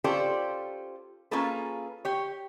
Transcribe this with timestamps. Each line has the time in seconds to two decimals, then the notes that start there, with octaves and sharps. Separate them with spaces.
0.04 C#4 F4 G4 A4 C5 D5
1.31 A#3 C#4 F4 G#4 A4 B4
2.05 G4 C#5